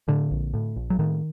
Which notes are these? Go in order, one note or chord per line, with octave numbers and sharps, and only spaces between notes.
A2 D3
A#1
A2
A#1
F#3
A2 D#3